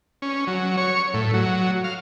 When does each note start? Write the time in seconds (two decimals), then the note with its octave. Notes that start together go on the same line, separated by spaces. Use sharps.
0.22 C#4
0.47 F#3
0.77 C#5
1.14 A2
1.34 F#3
1.84 F5